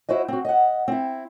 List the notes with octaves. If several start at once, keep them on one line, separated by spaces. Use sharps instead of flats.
E4 F#4 C5 D#5
C4 F#4
D#5 F#5
C4 E4